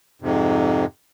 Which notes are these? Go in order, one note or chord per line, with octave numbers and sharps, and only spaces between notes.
F2 G#2 C3